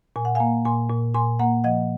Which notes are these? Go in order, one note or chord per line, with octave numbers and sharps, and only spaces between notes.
A#2 G#5
F#5
A#3 F5 G#5
A#2 G#5 C6
A#2
A#2 G#5 C6
A#3 F#5 A#5
F3 D#5 F#5